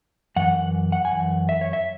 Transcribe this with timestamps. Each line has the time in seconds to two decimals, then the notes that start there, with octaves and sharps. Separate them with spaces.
0.36 F#2 E3 F#5
0.55 F#5
0.92 F#5
1.05 G#5
1.11 F#2 E3 F#5
1.49 E5
1.61 C#5
1.73 E5